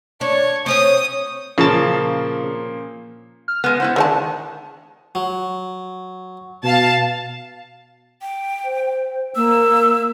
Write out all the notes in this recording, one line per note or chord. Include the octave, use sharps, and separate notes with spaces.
D4 C#5
C4 C#4 C#5 D#6
A#2 C#3 F3 A#3 A5
F6
G#3 B3
B3 E4 C5 F#5
D#3 G#3 D4 C#5 A5
F#3
B2 F5 A5
G5
C5
A#3 E6